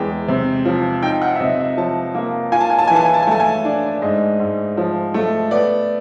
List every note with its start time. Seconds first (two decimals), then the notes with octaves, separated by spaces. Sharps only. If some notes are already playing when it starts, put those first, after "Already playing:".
Already playing: E2 G#3 G5
0.28 C3
0.65 F3
1.02 D#4 G5
1.21 F#5
1.36 E5
1.40 C3 D#5
1.59 E5
1.77 F3 A5
2.15 A#3
2.52 F4 G#5
2.60 A5
2.70 G#5
2.78 A5
2.87 E3 G#5
2.96 A5
3.05 G#5
3.14 A5
3.22 G#5
3.27 A3 A5
3.40 G#5
3.65 D4
4.02 G#2 D#5
4.40 G#2
4.77 F3
5.14 A3
5.51 B3 D5